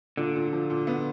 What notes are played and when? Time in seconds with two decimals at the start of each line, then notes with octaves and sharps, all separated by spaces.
0.17 A#2 D3
0.35 A#2
0.53 F3
0.70 A#2
0.87 B3